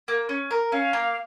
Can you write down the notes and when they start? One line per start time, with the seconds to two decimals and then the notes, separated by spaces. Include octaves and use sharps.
0.08 A#3
0.29 C#4
0.51 A#4
0.72 C#4 F5
0.93 A#3